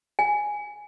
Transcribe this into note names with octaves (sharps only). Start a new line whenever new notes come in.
G#5